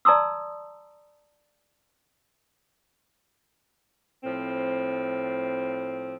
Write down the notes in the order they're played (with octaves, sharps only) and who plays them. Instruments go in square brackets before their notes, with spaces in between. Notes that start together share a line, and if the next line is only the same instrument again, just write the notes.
[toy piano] D5 A5 A#5 C6 D#6 E6
[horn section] A2 F3 C4